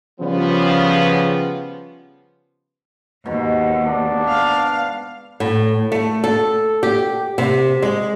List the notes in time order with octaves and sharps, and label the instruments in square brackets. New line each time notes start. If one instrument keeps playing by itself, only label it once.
[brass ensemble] C#3 F3 G3 B3
[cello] D#2 [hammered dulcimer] G#2 B2
[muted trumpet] D4
[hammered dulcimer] B4 B5 [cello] F5
[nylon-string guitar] A2
A3
A4
G4
C3
G#3